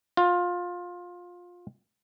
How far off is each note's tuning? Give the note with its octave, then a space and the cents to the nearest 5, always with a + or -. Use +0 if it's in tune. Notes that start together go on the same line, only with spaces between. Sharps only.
F4 +20